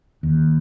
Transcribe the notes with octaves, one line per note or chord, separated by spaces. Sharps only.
D#2